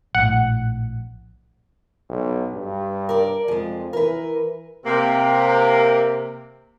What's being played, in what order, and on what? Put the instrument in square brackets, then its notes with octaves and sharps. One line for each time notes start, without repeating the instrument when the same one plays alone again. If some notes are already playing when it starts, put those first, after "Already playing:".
[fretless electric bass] A#1 A2 [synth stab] F#5
[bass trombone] B1
G2
[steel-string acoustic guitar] A#4 D5
[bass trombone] F2 [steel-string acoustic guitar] F3 G#3
[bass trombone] E3 [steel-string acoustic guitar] A#4 B4
[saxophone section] C3 A#3